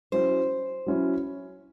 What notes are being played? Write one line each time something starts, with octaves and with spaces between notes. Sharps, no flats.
F#3 C#4 E4 C5
F#3 C#4 E4